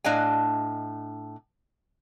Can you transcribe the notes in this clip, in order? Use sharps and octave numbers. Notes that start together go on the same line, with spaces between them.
A2 D4 D#5 F5 G#5